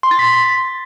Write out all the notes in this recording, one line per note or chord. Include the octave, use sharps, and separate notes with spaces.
C6
A6
B6